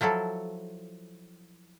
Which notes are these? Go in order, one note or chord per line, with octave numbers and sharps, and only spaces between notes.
F3 F#3 E4 A4